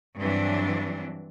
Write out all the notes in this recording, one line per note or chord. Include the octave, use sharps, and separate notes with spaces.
G2 E3 F#3 C4 D4